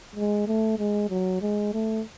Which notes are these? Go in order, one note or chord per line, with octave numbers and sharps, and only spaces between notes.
G#3
A3
G#3
F#3
G#3
A3